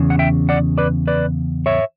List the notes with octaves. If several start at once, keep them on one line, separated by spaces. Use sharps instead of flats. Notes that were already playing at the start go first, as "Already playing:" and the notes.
Already playing: E2 C#3
F#5
E5 G5
D5 F#5
B4 D5
B4 D5
C#5 E5